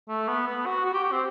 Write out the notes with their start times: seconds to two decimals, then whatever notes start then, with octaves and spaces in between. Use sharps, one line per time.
0.09 A3
0.28 B3
0.47 B3
0.66 F#4
0.85 F#4
0.94 G4
1.04 G4
1.12 C4